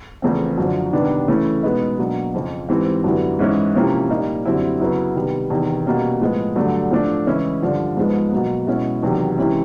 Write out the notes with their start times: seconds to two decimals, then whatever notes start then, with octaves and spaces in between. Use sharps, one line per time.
0.22 E2 C#3 F3 A3 C4
0.58 F#2 D3 F3
0.93 C3 D#3 G3 B3 D4
1.28 C#3 E3 A3 C#4 E4
1.63 B2 G#3 B3 D#4
1.99 B2 F#3 A#3 D4
2.34 F2 C#3 F3
2.69 G#2 E3 G3 C4
3.04 F#2 D3 G3 B3 E4
3.39 G#2 E3 G#3 C#4 E4
3.75 C3 F3 A#3 C#4 E4
4.09 A#2 G3 A#3 D#4
4.45 F#2 D3 G3 C4 E4
4.80 C#3 F#3 B3 E4
5.15 C3 D#3 G3 B3
5.50 E2 C3 D#3
5.86 B2 G3 A#3 C#4
6.21 A2 F3 G#3 B3
6.56 G2 D3 F#3 A3
6.91 A2 F3 A3 D4
7.27 C#3 E3 G#3 C#4 E4
7.62 G2 D3 F3
7.97 G#2 F3 G#3 B3
8.32 B2 F#3 A#3
8.67 B2 G#3 C#4 E4
9.03 E2 C3 D#3 F#3
9.38 C3 E3 G#3 C#4 E4